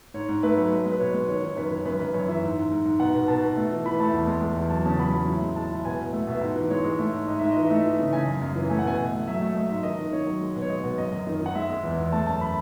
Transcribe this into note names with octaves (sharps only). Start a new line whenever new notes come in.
G#2 C#5
G#2
A3 B4
F#3
G#3
G#3
B4
B2 C#5
G#3
D#3 C#5
D#3 C#5
F#2 B4
D#3 C#5
F#2 B4
F#2 B4
F#2 C#5
E3 E5
G#2
G#2
G#2
G#2
B2 F#5
B2
B2 A5
B2
A3
E3
E3 B5
A3 A5
E2
G#3
G#3
E2
F#3 A5
C#3 A5
F#3 B5
F#3
A2
G#3
G#3 A5
A2
B2 G#5
B2
A3
B2 E5
G#2 F#5
E3
G#3 C#5
G#3
A3
G#2
G#2 D#5
G#2 E5
E3 D#5
E5
A3
D#5
E3
C#3
C#3 G#5
F#2
F#2
E3
A3 G#5
F#5
B2 G#5
B2
A3
F#3 E5
A3
A3 D#5
G#2 E5
D#3 D#5
D#3
D#3 C#5
F#3
G#3
B2
C#5
G#3 D#5
B2
F#2 D#5
F#2
D#3
D#3
F#5
G#3 E5
G#3
E2
E2
A3 A5
F#2 A5
B5